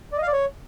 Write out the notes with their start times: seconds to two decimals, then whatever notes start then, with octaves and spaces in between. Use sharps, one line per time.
0.12 D5
0.17 D#5
0.22 F5
0.27 D5
0.33 C#5